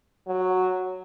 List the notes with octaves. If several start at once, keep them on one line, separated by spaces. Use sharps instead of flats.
F#3